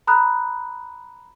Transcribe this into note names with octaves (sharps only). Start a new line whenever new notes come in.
A#5 B5 D#6 F#6